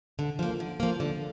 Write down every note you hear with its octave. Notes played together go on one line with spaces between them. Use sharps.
D3
F3 A#3
D3
F3 A#3
D3